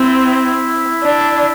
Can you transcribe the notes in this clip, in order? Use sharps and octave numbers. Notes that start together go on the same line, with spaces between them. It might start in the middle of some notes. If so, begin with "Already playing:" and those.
Already playing: C4 E4
D4